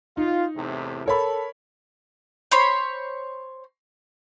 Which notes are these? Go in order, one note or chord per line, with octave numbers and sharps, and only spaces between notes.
D#4 F4
E2 A2 C3
A4 A#4 C#5 B5
C5 C#5 B5 C6